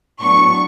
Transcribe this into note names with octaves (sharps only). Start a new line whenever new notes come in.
A2 F#3 B3 D4 C#6